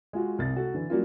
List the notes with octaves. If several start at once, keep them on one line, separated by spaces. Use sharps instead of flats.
G#3 F4 F#4
C2 A6
F#4 A4
D3 E3
F#3 G3 A#3 C#4 F4